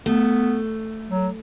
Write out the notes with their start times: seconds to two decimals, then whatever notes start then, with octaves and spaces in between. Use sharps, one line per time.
0.06 A3 B3
1.10 F#3